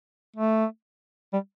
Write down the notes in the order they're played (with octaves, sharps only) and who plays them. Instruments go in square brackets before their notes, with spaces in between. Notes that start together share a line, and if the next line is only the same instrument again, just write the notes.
[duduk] A3
G3